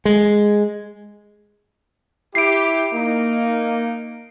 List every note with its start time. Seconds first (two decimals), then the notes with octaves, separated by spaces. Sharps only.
0.05 G#3
2.35 E4 G4 C7 D7
2.93 A#3 D#4